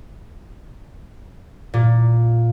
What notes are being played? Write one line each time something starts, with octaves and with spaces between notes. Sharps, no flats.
A#2